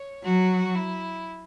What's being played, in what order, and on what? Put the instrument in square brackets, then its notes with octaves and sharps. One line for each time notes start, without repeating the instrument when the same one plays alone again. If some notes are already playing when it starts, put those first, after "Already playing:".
Already playing: [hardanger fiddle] C#5
[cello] F#3 [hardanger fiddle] F#4
[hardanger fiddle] E4